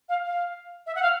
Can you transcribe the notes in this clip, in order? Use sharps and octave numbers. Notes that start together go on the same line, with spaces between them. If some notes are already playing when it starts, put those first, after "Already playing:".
F5
F5
E5
F#5
F5